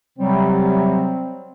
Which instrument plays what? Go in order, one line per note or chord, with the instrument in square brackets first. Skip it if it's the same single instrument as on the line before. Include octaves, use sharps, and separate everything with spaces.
[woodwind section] C3 F#3 G3 [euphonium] C4